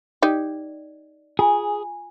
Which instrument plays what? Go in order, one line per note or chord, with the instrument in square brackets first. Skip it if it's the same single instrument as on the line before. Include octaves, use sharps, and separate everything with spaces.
[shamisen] D#4 G4 [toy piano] D5
[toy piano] F4 G#5 [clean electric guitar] G#4